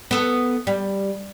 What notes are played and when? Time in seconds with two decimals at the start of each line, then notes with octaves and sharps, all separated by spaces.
0.11 B3 A4
0.67 G3